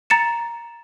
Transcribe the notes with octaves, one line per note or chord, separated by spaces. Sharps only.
A#5 A6 C#7 E7